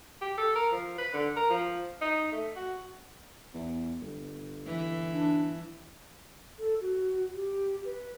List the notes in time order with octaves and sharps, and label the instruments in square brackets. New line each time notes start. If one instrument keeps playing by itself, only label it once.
[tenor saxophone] G4
A4
A#4
F3
B4
D3
A#4
F3
D#4
A3
F#4
[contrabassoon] E2
G1
[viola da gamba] E3
[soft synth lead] D4
[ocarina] A4
F#4
G4
B4